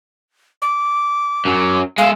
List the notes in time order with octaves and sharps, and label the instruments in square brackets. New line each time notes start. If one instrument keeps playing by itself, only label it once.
[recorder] D6
[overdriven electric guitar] F#2 F#3
[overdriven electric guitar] G#3 E5 [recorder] F5